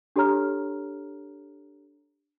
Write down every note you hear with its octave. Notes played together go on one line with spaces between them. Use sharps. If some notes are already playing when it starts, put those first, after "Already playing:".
D4 G4 A4 C#5 A#5 F6